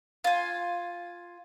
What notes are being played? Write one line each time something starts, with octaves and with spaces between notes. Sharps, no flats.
F4 G#5